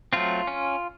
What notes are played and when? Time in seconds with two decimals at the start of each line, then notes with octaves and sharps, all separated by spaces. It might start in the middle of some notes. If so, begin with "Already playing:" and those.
0.13 F#3 A3 C4 F4
0.47 C#4